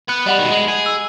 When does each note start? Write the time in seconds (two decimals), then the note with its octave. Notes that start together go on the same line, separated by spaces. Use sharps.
0.09 B3 F#6
0.27 G3 D#5 F#5 B5
0.39 B2 D#3
0.50 G#3
0.68 G#4
0.86 E6